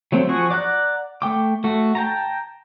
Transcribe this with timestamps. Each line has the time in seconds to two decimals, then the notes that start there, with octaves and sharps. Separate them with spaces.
0.12 F#3 A3 C4
0.28 F3 F#4 G#4 C#6
0.51 D5 F#5 A#5 F#6
1.22 A3 G5 D6
1.64 A3 F#4 A4
1.95 G5 A5 A#5